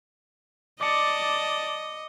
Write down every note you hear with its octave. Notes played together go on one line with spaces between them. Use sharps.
D5 D#5 A5 D6 C#7